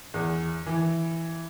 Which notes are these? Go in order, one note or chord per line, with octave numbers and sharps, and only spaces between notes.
E2
E3